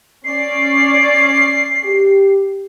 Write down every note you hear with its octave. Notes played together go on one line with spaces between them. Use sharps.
C#4 D5 C7
G4